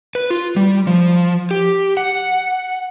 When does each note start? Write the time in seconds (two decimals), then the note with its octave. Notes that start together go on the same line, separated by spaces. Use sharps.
0.15 B4
0.30 F4
0.56 G3
0.87 F3
1.51 G4
1.97 F#5